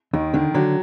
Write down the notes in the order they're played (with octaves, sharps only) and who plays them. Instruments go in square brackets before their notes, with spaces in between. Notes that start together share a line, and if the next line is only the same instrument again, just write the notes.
[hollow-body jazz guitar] D#2 [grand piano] D#3
[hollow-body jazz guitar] D3 [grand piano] D#3
[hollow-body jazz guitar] D3 [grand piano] F#3